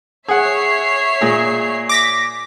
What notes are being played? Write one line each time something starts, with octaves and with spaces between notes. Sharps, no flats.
G#4 C#5 E5 F#5 C7
A#2 G#4
D6 A#6 B6